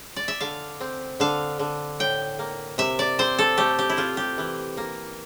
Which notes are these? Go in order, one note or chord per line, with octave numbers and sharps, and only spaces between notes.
D5
E5
D3 F5
C4
D3 F5
D3
A2 G5
A#3
C3 E5
D5
C4 C5
A4
A3 G4
G4
E4
C4 F4
G4
E3
A#3